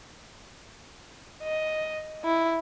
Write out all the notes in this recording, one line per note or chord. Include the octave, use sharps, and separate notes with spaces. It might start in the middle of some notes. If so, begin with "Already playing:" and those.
D#5
E4